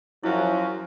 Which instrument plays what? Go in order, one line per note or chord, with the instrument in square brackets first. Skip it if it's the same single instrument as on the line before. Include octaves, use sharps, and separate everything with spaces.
[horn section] F#2 F#3 [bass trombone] F3 [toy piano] E4